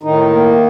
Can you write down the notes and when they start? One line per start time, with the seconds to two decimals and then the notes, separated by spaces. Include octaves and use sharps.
0.03 A2 D#3 D#4
0.30 A#3